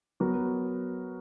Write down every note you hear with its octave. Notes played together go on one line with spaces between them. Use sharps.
F#3 B3 F#4 A#4